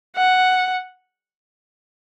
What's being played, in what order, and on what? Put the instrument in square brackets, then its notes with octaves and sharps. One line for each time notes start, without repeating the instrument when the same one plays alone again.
[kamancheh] F#5